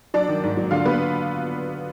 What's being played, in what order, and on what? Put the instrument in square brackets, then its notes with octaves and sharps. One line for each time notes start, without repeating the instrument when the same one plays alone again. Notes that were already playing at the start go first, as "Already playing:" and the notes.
[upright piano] F#3 [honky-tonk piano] D4 D5
[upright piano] D#3
G#2
F#3
[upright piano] D3 [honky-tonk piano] F4 F5
[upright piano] D3 [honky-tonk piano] B3 B4